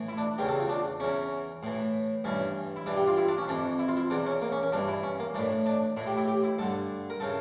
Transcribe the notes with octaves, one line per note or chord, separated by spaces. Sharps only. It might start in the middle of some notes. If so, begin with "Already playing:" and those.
Already playing: A2 E3
E4
D4
E2 C#3 E3 G4
A4
F4
D4
E2 E3 C#4
A2 E3
G2 E3 C#4
E4
G2 E3 D4
G4
F4
E4
D4
C#4
F2 E3 D4
E4
F4
E4
E2 E3 D4
C#4
A#3
C#4
C#4
G2 E3 D4
E4
C#4
A#3
A2 E3 D4
D4
A2 E3 E4
G4
E4
G4
E4
G2 D3 A4
A#4
C#3 E3 A4